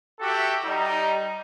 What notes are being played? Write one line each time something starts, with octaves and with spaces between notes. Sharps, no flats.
F#4 G4 A4 E5
G3 D#4